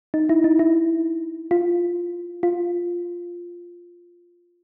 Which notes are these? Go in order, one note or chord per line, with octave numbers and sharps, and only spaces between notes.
D#4
E4
D#4
E4
F4
F4